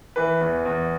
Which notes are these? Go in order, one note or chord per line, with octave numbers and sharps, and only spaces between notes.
E3 B4
E2
E2